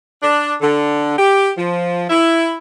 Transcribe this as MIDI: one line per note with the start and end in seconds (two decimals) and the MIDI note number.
0.22 0.54 62
0.61 1.16 50
1.18 1.50 67
1.56 2.06 53
2.09 2.57 64